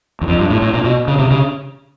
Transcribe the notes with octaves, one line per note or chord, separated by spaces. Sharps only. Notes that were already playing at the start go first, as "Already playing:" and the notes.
E2
F2
G2
A2
A2
A#2
B2
C#3
C3
C#3